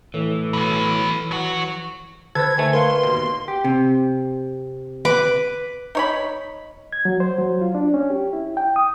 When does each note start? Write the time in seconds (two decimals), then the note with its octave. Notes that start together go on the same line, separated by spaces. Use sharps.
0.14 A2 E3
0.53 B2 F#3
1.31 F#3 F#4
2.35 D3 A4 B4 C5 G#6
2.58 D#3 A3 G#5
2.73 A#4 B4 F5 C6
3.03 D#2 B2
3.48 G4
3.64 C3
5.05 B4 D6
5.95 D#4 C#5 B5
6.93 G#6
7.05 F#3
7.20 C5
7.39 F#3
7.61 F4
7.75 D4
7.94 C#4
8.10 G4
8.33 E4
8.57 G5
8.76 D#6